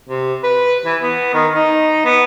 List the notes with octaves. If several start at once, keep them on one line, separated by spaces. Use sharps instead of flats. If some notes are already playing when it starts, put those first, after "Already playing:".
C3
B4
E3
B3
D#3
D#4
B3